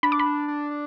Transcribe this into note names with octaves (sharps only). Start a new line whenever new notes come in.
D4 B5
D6
B5
D4
D4
D4